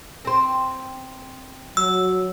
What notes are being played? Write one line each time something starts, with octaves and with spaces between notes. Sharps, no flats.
C4 C5
F#3 E6